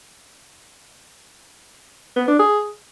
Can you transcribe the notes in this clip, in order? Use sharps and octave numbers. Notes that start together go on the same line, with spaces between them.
B3
D4
G#4